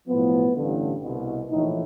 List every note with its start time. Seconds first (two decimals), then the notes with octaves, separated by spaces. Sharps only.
0.08 B1 A2 F3 B3
0.56 A1 G2 D3
1.02 C2 B2
1.50 A#1 A2 E3 D#4